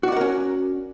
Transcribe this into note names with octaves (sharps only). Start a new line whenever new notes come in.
C#4 F#4 A#4 D5 F#5